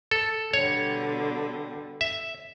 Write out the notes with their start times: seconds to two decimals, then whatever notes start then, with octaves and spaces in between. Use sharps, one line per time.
0.11 A4
0.53 B2 D3 G3 C#5
2.01 E5